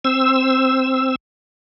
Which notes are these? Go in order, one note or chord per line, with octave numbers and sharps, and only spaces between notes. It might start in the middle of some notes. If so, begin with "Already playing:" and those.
C4 E6